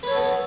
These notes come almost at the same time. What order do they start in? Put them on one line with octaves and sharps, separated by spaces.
B4 C#5 A4 B3